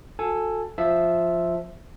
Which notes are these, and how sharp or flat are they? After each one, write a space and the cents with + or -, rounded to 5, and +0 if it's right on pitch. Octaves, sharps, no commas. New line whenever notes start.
F#4 -30 A4 +5 G#5 +0
F3 +0 E5 +0